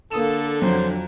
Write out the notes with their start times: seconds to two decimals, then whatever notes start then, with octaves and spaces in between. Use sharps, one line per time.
0.11 D3 A#3 A4 D#6 E7
0.62 F2 F#3 C5